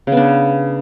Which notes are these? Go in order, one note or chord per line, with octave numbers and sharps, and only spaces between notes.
C#3 B3 D4